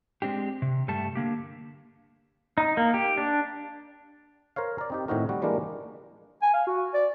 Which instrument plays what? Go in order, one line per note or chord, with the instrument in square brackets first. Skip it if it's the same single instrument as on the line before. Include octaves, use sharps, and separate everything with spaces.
[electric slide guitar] G#3 C4 D4 G4
C3
G2 G3 A3 A5
D3 A#3 G4
[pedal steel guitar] D#4
A#3
G4
D4
[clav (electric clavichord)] A#4 C5 C#5 F5
A#4 D5
C4 D#4 G4
A2 D#3 C4 D#4 F#4 A#4
G3 F#4
E3 G3 G#3 A#3 D4 A#4
[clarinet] G#5
F5
F#4
D5